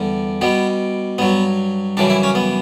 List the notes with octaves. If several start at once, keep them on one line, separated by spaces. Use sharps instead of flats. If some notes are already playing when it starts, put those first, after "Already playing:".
Already playing: E2 D3 G3
B2 G3 B3
G2 F#3 B3
F#2 C#3 E3 G3 D4
E4
C#4
B3